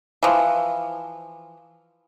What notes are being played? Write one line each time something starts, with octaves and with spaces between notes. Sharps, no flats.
E3 F3